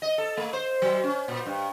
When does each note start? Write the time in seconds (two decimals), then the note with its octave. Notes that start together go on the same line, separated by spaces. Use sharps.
0.02 D#5
0.18 A4
0.37 A3
0.53 C5
0.82 F#3
1.04 C#4
1.28 A#2
1.46 G2